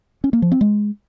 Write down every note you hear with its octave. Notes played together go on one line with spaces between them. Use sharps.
C#4
A#3
F3
C4
G#3